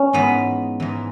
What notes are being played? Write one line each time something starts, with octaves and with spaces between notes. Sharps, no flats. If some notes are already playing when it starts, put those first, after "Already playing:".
Already playing: C#4
G#2 E3 B3
G#2 E3